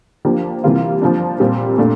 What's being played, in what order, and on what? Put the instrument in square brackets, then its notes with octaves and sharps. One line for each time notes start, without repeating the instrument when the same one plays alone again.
[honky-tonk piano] F3 A#3 D4 G4
C3 E3 G3 A#3 F4
F3 A#3 D4
A#2 G3 C4
A#2 A3 D4